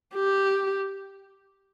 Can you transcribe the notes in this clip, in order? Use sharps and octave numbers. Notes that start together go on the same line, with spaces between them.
G4